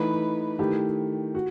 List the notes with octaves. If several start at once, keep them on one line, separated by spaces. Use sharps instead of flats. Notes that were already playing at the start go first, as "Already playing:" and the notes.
Already playing: E3 A3 D#4 B4
D#3 A3 E4 G4
F#4